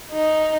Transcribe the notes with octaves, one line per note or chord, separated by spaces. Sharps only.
D#4